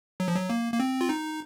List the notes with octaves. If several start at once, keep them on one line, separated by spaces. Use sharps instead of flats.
F#3
F3
F#3
A#3
A#3
C4
F4
D#4